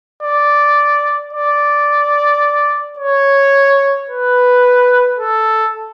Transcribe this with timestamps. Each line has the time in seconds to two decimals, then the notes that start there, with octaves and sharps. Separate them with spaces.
0.23 D5
1.33 D5
2.99 C#5
4.09 B4
5.19 A4